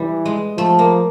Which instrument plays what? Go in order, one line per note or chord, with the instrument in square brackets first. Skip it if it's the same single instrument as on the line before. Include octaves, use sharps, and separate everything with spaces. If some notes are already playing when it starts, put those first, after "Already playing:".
Already playing: [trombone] E3 [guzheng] G3
[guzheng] G#3
[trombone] F3 [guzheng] A3
[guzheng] A#3